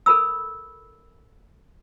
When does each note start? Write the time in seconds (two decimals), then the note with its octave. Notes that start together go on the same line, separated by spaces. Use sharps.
0.06 A4 A#4 B5 E6